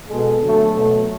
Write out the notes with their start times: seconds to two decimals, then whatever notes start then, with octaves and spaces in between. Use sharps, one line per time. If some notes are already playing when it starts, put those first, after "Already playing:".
0.09 B2 G#3 A4
0.42 D3 F#3 A3
0.75 B2 F#3 A3